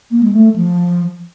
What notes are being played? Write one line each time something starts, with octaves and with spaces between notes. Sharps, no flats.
A#3
G#3
A3
F3